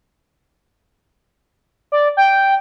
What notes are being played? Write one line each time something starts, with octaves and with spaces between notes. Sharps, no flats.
D5
G5